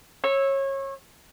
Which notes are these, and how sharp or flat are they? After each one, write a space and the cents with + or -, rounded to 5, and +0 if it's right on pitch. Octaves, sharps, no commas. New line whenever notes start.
C#5 -25 E6 -5